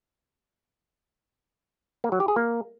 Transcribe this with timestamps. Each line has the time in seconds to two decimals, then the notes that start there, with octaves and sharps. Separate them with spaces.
2.04 A#3
2.12 F#3
2.20 G4
2.28 G#4
2.36 A#3